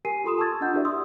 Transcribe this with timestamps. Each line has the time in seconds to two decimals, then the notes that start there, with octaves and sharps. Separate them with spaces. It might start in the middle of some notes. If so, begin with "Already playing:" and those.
0.05 G4 A#4 G#5 C7 D#7
0.24 F4 A4 C6 D#6 E7
0.38 A5 C6 C#6 E6 G#6 A6
0.61 D4 F4 D#5 F#5 G6
0.73 E4 F#4 G4 A#4 D5 E5
0.85 C6 D#6 E6